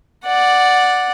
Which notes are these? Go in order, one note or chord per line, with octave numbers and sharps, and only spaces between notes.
D5 F#5